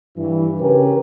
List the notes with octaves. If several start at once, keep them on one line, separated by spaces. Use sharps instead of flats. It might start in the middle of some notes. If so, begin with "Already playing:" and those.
G2 E3
C#3 C#4 G4 A#4 B4